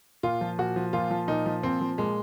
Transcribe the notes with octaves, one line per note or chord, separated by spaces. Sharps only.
A#2 F4
F3
A#2 F#4
F3
A#2 F4
F3
A#2 D#4
F3
A#2 C4
F3
A#2 G#3